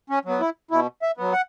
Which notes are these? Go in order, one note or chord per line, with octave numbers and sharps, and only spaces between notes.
C#4
F#3 B3
E4
B2 E4
E5
F#3 B3
F#5